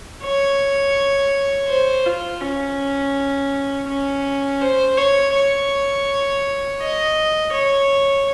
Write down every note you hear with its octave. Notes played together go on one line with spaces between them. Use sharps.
C#5
C5
F4
C#4
C#4
C5
C#5
C#5
D#5
C#5